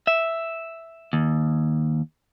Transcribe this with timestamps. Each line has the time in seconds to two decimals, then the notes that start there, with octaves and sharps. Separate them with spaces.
0.07 E5
1.13 D#2